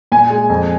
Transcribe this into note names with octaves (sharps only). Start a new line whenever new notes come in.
A#2 G#5
G#3
F2